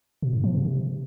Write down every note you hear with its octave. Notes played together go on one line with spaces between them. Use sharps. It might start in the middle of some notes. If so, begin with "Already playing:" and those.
B2
G#2
F3
C3
C3